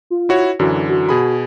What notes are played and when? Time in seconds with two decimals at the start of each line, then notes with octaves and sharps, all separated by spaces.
0.10 F4
0.29 E4 F#4 C#5
0.59 F#2 D3 E3 F#4
0.89 F#4
1.09 B2 G#4 B5